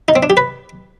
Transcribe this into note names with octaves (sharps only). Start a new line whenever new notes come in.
D#4
C4
D4
G4
B4